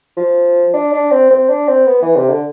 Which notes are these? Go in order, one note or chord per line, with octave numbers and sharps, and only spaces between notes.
F3
D4
D4
C4
C4
D4
C4
B3
E3
C3
D3